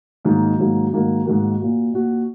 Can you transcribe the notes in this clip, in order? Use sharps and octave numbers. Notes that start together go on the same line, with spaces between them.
G#2 D#3 F#3 A#3
G#2 D#3 F#3 A#3
G#2 D#3 A#3 F#4 A#4
G#2 D#3 A#3 F#4 A#4
A#2 A#3 F#4
A#2 A#3 F#4